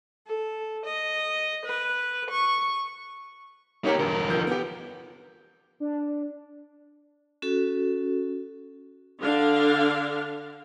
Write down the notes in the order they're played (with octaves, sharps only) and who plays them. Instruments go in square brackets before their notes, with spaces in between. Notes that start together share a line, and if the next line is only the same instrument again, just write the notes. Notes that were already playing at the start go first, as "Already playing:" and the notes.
[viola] A4
D#5
B4
C#6
[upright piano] A#3 G4 A#5 [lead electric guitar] D#4 C#5
[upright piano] E1 G2 [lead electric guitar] D3 A#4
[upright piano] F1 F3 G6
B3 G4
[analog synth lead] D4
[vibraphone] C#4 F#4 A4
[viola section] D3 D4 F5